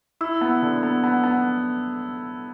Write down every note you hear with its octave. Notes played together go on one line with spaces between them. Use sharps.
E4 E6
B3
D3
B3
B3
B3